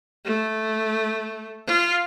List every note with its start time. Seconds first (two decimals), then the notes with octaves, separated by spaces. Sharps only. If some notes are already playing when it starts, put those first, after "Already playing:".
0.25 A3
1.67 F4